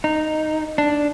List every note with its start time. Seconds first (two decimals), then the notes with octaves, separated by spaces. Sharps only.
0.04 D#4
0.78 D4